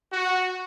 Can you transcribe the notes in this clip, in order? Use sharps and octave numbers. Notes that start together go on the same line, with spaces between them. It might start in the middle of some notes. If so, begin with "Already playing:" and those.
F#4